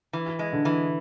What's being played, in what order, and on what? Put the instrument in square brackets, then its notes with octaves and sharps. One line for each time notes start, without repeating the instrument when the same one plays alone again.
[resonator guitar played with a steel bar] E3
G#3
[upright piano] D3
[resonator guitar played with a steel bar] E3